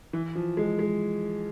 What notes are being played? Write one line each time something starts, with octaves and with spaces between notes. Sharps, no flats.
E3
F3
G#3
G#3